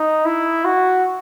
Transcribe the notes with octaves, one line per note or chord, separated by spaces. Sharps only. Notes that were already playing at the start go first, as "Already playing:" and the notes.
Already playing: D#4
E4
F#4